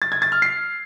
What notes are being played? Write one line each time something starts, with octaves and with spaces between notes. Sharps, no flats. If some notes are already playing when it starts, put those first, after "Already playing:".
A6
G#6
A6
F6
C7